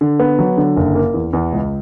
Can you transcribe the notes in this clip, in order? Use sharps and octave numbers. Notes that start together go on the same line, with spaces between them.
D3
B3
F#3
D3
F#1
A#3
E2
E2
C#2